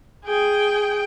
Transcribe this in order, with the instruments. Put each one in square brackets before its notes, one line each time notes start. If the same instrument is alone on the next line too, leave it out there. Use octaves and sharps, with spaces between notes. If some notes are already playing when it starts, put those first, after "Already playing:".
[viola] G#4 G5